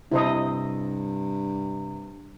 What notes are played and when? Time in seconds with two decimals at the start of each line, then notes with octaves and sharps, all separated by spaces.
0.12 G2 C3 E4 C5 D#5 A5